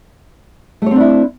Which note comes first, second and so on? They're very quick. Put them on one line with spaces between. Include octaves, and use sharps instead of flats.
A3 C#5 C4 D4 E4